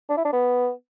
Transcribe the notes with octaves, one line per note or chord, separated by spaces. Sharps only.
D4
E4
D4
B3